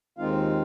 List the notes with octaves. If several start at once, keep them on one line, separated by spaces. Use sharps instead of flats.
D#2 D#3 G#3 C4 D#4 F4 F5